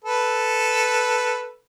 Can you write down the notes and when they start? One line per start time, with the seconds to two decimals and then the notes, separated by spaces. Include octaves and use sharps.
0.05 A4 B4